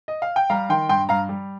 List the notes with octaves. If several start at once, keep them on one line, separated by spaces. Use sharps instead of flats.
D#5
F5
G5
G3 F5 A#5
D#3 G5 C6
G2 G5 C6
G2 F5 A#5
G3